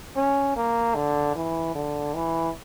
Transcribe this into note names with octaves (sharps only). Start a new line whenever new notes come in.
C#4
A#3
D3
E3
D3
E3